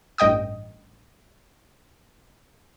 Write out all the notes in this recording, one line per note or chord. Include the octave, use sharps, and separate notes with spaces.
A1 G2 D#5 G5 D#6